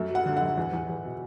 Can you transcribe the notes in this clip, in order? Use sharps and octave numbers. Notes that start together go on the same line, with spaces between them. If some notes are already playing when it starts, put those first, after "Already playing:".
Already playing: F#2 A3
F#3 F#5
D3
F#2 F#5
E2
E2
E2
B2